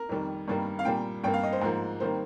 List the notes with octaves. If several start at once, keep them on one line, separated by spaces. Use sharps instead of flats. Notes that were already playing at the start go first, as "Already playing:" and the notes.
Already playing: A#4
F2 D#3 G3
G2 D#3 G3 A#3
F5
A#2 G3 A#3 G5
G2 G3 A#3 G5
F5
D#5
C5
G#2 F3 A#3
D#3 G3 A#3 C5